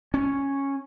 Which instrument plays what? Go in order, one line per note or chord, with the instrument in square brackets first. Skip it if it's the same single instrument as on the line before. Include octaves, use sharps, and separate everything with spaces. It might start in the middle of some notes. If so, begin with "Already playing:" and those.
[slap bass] C#4